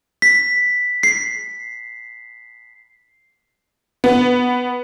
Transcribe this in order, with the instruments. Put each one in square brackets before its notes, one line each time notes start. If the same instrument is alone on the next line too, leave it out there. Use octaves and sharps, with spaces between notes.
[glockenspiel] B6
C7
[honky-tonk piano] B3